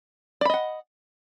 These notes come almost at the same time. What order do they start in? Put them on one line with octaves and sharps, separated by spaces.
D5 B5 D#5 F#5